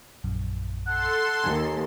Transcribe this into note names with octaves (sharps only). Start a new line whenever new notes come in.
A#1 F#2
A4 F#5 C6
D#2 G#5